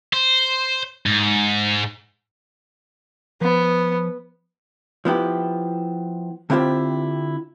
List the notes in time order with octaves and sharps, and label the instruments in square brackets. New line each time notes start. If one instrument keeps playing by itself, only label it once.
[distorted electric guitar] C5
G#2
[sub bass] F3 [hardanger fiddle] B3
[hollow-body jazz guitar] F3 B3 E4 G4
D3 C4 E4 F4 G4 C5